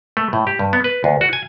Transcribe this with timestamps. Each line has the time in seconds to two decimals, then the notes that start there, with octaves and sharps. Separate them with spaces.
0.17 A3
0.33 A2
0.47 G4
0.59 G2
0.73 B3
0.84 B4
1.04 D2
1.21 F#4
1.33 G#5